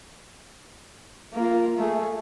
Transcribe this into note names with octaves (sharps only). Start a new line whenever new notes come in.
A#3 F4
A3 G#4